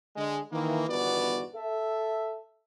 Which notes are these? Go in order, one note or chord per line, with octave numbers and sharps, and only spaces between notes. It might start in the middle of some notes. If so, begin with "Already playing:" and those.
D3 G#3
D#3 E3 A#3
G1 E2 D#3 B3 F#4 D5
A4 E5